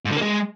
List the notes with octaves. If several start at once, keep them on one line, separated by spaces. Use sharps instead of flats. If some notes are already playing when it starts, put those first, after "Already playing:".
G#2
D3
A#3
G#3